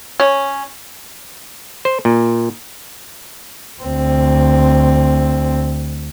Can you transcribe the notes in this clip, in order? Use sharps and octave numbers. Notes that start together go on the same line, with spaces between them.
C#4
C5
A#2
D2 C4